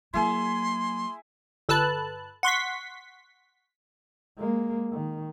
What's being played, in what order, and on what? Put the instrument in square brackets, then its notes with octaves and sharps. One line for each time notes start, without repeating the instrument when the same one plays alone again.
[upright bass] F#3 A#3 [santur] E4 G#4 G#5 [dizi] C6
[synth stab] G1 A4 B4 A5 F#6
F#5 C6 C#6 B6
[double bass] G#3 A#3
D#3